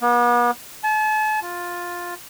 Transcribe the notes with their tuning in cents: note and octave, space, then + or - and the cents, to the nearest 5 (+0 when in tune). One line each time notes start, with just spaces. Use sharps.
B3 -40
A5 -40
F4 +10